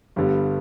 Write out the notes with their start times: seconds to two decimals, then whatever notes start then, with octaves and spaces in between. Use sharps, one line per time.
0.16 G1 G2 D3 G3 B3